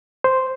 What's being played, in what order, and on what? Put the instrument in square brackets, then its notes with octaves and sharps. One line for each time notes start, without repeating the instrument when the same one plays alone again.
[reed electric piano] C5